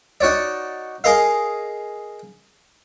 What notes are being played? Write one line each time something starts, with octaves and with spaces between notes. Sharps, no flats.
D#4 F#4 C#5 D5
G#4 A#4 D#5 F5